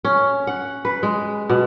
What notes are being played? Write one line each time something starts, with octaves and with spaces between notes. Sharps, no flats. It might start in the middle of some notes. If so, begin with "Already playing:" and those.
C#4
F#5
B4
G#3
B2